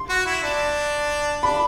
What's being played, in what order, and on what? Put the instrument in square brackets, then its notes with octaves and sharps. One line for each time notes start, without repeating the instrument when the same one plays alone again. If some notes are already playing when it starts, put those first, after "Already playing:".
Already playing: [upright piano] C6
[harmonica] F#4
E4
D4
[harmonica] D4 [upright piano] B5